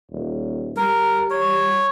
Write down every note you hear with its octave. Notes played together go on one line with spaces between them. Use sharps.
D#1
G3 A#4
C#5